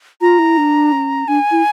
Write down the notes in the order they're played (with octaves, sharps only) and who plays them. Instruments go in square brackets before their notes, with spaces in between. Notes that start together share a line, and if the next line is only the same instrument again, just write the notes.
[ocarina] F4 [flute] A#5
[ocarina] E4
D4
C#4
[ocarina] D4 [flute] G#5
[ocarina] E4